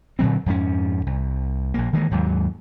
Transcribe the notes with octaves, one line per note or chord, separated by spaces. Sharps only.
A#2 D3 F#3 C4
F2 G#2 C#4
C2
A#1 A#3
D#3 E3 G#3 A#3
D#2 G#2 F#3